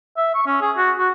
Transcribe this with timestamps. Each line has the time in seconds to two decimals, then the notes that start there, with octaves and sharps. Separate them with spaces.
0.17 E5
0.35 C#6
0.46 C#4
0.61 G#4
0.77 F#4
0.98 F#4